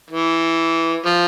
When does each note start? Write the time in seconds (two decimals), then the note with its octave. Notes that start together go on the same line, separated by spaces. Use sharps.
0.10 E3
1.06 F3